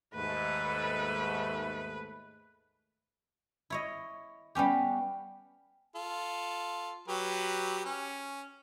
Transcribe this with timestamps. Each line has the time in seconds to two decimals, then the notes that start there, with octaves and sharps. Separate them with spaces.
0.14 D#2 G#2 A3 B4
3.70 E4 C#5 D#5
4.55 G3 B3 C#4 G4
5.96 F4 A4
7.08 F#3 G4 B4
7.85 C#4